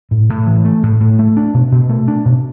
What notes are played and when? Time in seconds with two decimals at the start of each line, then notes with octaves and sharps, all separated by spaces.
0.11 A2
0.30 A2
0.47 E3
0.65 A3
0.83 A2
1.01 A2
1.19 A3
1.37 D4
1.54 B2
1.72 B2
1.89 A3
2.08 D4
2.25 B2